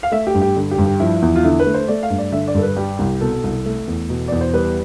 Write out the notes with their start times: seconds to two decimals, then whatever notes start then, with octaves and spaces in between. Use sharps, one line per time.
0.03 F5
0.12 A3 E5
0.27 G4
0.35 G2
0.42 G4
0.56 D3
0.71 G4
0.78 G2
0.86 G4
1.00 F3 E4
1.22 E2
1.36 F4
1.44 D3 E4
1.60 B4
1.66 A3
1.74 C5
1.88 A3 D5
2.03 F5
2.10 G2
2.18 D5
2.32 D3 E5
2.48 D5
2.55 G2 A4
2.62 B4
2.76 G3 G4
2.99 C2
3.21 B2 A4
3.44 C2
3.66 A3
3.88 E2
4.10 B2
4.28 E2 D5
4.41 C5
4.54 G3 B4